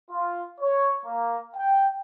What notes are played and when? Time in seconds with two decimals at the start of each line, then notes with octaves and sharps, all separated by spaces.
0.11 F4
0.61 C#5
1.05 A#3
1.55 G5